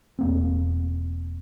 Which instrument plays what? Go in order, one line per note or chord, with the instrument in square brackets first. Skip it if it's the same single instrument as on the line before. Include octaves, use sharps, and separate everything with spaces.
[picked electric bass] E1 A#3 C4